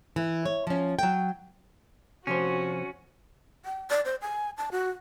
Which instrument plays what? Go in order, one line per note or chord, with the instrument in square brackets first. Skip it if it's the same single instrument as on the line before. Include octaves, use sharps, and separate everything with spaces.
[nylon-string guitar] E3
C#5
F3 C#4
F#3 G5
[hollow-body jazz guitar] C3 F3 C5 [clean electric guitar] C#4 [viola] F#4
[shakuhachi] G5
D5
C5
G#5
A5
F#4